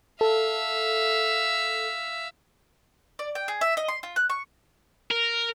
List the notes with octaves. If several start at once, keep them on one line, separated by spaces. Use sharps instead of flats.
A4 E5 F5
D5
G5
G#4
E5
D#5
C6
F4
F#6
C#6
A#4